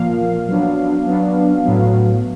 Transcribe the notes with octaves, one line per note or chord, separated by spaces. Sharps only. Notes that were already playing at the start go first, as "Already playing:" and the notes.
Already playing: A#2 F3 A#3 F5
F#3 B3 D4
F#3 B3 D4
A2 F#3 B3